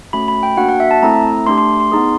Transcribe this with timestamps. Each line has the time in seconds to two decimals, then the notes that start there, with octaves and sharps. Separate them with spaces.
0.13 A3 C#4 F#4 B5
0.28 B5
0.43 G5
0.57 A#3 D4 F#4 F#5
0.69 F#5
0.80 E5
0.91 A5
1.03 A3 C4 E4 A4 A#5
1.46 A3 D4 G4 C6
1.58 C6
1.80 C6
1.92 B3 D#4 G#4